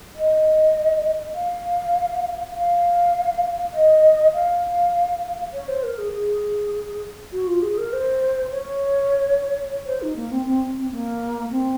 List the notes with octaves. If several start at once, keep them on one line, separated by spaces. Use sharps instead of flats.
D#5
F5
F5
D#5
F5
C#5
C5
A#4
G#4
G#4
F#4
F4
G#4
A#4
C5
C#5
C#5
C5
D#4
A#3
C4
C4
C4
A#3
C4